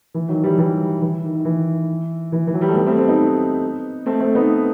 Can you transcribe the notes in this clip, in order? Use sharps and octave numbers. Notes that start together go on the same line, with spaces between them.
E3
D#3 F#3
E3 G3
E3 G3
E3
D#3
D#3
E3
E3
E3
F#3
G3
A3
G3 B3
A3 C4
A3 C4
B3 D#4
A3 C4
A3 C4
B3 D#4